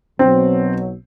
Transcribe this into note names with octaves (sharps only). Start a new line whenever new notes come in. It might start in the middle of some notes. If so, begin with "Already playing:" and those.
B1 B2 F#3 C4